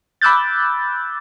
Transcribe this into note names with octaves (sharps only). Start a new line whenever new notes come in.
B5 D6 E6 F#6 G6 A6